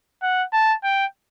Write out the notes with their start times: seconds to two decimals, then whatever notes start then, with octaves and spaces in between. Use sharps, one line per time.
0.22 F#5
0.53 A5
0.84 G5